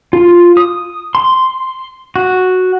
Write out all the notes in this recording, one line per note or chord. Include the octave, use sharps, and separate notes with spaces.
F4
D#6
C6
F#4